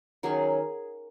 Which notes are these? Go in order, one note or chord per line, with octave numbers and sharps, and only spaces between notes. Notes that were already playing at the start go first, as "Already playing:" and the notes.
D#3 F#3 C#4 G#4